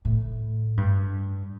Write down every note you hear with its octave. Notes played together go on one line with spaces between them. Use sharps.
A2
G2